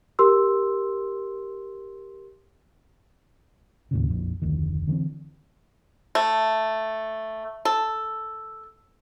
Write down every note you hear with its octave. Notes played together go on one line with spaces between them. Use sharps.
G4 A#4 C6 E6
D#2 A2 C#3
A#1 F2
F1 D2 D#3
D3 E3 G#3 C4
A3
A4